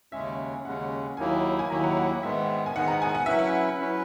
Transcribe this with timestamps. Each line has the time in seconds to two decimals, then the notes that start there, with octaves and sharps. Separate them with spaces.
0.12 D#2 C#3 G#3 C#4 E5
0.65 D#2 C#3 G#3 C#4 F#5
1.17 D#2 D#3 F#3 A#3 E4 G#5
1.59 G#5
1.70 D#2 D#3 F#3 A#3 E4 A#5
1.84 F#5
1.97 F#5
2.23 G#2 D#3 G#3 B3 E5
2.66 G#5
2.75 G#2 D#3 G#3 B3 F#5
2.88 A#5
3.02 G#5
3.15 F#5
3.26 F#3 C#4 E4 B4 E5
3.39 F#5
3.80 F#3 C#4 E4 B4